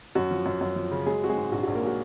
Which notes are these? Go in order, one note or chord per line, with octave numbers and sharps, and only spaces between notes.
F#2 F#4
F3
F#2
F#2
F3
C#3
F#3 G#3 G#4
C4 F#4
G#3 G#4
G#2
A#1 F#4
F#4
A#1
A#3 A#4
F#3 F#4